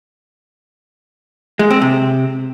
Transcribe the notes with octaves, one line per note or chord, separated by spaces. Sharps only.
G#3
C4
C3